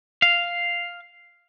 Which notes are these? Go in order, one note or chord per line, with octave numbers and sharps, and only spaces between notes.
F5